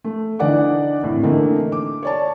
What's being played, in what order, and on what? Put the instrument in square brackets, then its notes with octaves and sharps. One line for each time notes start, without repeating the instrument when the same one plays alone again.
[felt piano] A3
D3 E3 D#4 D5 F#5 D6
G#1 F2 A2
D3 E3 A3 A#3 D#4
D6
C#5 D5 A5